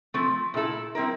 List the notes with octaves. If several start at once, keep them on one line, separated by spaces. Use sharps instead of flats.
F3 A3 C4
A#2 A3 E4 A4
G3 C4 E4 A#4